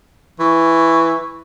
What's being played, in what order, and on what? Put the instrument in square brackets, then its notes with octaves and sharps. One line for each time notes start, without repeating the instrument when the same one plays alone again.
[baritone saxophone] E3 [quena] C#6